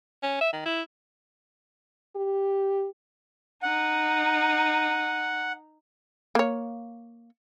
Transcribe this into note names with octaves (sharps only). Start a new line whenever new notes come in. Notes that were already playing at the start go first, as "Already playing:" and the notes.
C#4
E5
D#3
E4
G4
D#4 F#5
A#3 C#5